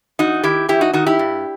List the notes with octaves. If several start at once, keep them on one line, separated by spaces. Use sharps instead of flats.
E2 D#4 F#4
D#3 E4 G4
E2 E4 G4
D#4 F#4
D#3 D#4 F#4
E4 G4
G2